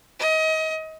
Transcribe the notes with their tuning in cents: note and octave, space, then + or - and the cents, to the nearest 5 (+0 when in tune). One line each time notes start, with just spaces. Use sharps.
D#5 +30